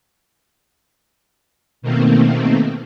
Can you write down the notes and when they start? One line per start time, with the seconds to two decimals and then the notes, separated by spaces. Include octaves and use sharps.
1.82 B2 D#3 A3 A#3 C4